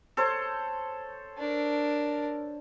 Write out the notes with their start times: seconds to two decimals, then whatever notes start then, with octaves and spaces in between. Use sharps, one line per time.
0.17 A4 C5 C#5
1.38 D4 A#4